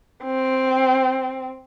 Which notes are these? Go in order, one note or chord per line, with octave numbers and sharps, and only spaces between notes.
C4